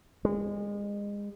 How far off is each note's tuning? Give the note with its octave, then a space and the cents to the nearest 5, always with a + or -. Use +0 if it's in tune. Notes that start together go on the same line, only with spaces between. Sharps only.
G#3 -30